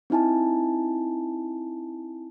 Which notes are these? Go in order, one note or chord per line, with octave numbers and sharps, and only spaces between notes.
C4 D#4 E4 G#5 A5